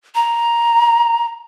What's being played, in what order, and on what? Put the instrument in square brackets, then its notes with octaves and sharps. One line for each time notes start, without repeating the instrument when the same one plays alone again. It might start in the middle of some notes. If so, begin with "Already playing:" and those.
[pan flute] A#5